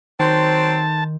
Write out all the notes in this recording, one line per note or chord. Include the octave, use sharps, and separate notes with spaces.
D#3 F#3 C4 D#4 A5 C6 G6